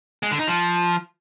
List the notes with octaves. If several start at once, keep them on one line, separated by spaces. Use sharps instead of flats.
G#3
D3
D#4
F3